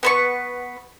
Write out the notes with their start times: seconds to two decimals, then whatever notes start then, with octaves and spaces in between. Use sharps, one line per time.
0.03 B3 B4 C#6